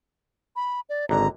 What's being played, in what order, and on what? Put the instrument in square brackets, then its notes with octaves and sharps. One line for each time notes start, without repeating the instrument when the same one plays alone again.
[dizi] B5
D5
[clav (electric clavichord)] G#1 D3 [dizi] A#5